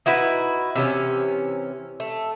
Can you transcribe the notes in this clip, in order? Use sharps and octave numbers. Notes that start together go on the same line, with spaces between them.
D#4 E4 F#4 B4
C3 E3 B3 C#4
A3